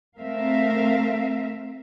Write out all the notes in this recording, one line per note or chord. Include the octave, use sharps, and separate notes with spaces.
A3 C4 A#4 E5 F5